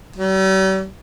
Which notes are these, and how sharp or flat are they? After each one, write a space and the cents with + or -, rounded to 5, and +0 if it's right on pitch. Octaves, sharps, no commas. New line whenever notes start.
G3 -45